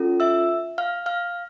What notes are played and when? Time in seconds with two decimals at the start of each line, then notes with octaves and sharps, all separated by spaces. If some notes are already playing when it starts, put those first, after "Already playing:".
Already playing: C#4 F4 A4
0.20 E5 E6
0.78 F5 F6
1.06 F5 F6